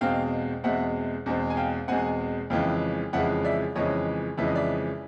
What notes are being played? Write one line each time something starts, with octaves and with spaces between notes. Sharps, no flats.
E2 B2 G#3 C4 F5 G5
E2 B2 G#3 C4 E5 F#5
E2 B2 G#3 C4
G#5
F5 G5
E2 B2 G#3 C4 F#5 G#5
F2 C#3 E3 G#3 F5 G5
F2 C#3 E3 G#3 E5 F#5
D5 E5
F2 C#3 E3 G#3 C#5 D#5
F2 C#3 E3 G#3 E5
D#5
D5 E5